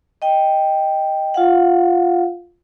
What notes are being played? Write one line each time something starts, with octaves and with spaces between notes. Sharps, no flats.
D#5 G5
F4 F5 F#5